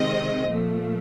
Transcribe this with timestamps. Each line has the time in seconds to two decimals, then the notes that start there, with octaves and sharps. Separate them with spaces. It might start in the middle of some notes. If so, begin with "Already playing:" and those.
Already playing: C3 D#3 G#3 C4 D#5
0.51 A#2 F3 A3